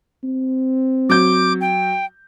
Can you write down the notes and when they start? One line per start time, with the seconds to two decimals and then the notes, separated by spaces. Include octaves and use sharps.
0.23 C4
1.09 F#3 D6 G6
1.61 G5